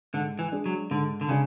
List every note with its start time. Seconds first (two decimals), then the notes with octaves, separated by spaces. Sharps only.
0.14 G#2 D3
0.39 E3
0.52 G#3 D4 G#4
0.66 F#3
0.91 G#2 D3
1.21 D3
1.29 C#3 G#3 D4